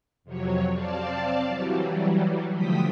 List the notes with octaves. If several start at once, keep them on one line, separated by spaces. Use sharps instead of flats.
F2 C3 F#3 C#5
C4 D5 F5 A5
E3 F#3 G3
D3 F3 A3 G5 D#6 B6